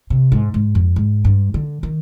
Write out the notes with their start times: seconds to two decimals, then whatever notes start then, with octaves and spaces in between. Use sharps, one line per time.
0.10 C3
0.32 G#2
0.54 G#2
0.75 F2
0.96 G#2
1.25 G2
1.54 D3
1.83 D#3